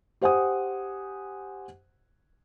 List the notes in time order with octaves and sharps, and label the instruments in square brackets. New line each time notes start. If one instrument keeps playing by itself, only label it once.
[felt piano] G4 C5 F#5 G#5 D#6